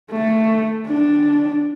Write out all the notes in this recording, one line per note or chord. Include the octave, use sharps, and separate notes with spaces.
A3
D4